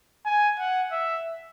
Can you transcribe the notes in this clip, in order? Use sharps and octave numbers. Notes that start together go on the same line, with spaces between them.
G#5
F#5
E5